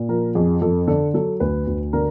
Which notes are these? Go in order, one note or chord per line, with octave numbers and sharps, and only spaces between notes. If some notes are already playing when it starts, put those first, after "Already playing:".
Already playing: A#2
F3 A#4
F2 G#4
F2 A4
D3 A4
F#3 A4
D2 B4
D2
D3 A#4